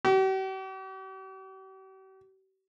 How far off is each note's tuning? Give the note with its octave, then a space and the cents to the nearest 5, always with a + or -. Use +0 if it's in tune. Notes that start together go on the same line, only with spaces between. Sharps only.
G4 -45